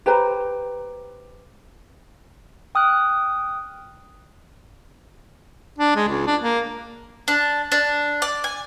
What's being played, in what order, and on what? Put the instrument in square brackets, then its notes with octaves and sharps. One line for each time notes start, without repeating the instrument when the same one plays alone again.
[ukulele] G4 B4 C5 A#5
[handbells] G5 D#6 F6 F#6
[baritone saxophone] D4
G#3
C#2
D4
A#3
[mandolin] D4
D4
D5
G#5